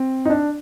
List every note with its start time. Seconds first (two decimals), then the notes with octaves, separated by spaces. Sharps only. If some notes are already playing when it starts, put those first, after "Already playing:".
Already playing: C4
0.25 D#4
0.30 D4